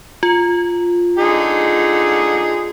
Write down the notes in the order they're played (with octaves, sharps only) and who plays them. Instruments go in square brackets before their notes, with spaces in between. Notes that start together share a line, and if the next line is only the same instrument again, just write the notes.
[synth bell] F4
[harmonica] D3 D#4 G#4